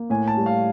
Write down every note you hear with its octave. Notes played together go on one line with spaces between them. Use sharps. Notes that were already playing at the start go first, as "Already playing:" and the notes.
Already playing: A#3
A2 G#5
A5
G3
F5